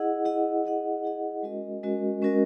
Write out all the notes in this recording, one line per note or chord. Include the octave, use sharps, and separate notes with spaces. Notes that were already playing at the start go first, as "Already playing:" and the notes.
Already playing: E4 G#4 D#5 F#5
E4 G#4 D#5 F#5
E4 G#4 D#5 F#5
E4 G#4 D#5 F#5
G#3 C#4 F#4 A#4 D#5
G#3 C#4 F#4 A#4 D#5
G#3 C#4 F#4 A#4 D#5